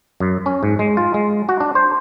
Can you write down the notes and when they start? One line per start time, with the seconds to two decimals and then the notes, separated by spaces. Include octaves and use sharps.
0.20 F#2
0.46 C#4
0.63 G#2
0.79 G#3
0.97 F4
1.14 G#3
1.49 F#4
1.60 D4
1.75 C5